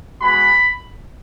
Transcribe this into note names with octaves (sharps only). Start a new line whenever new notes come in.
G#3 B3 F#4 B5